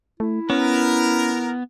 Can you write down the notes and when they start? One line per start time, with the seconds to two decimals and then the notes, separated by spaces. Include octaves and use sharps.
0.20 A3 E4
0.50 B3 C#4 A#4